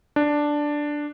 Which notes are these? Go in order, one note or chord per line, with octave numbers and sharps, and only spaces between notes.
D4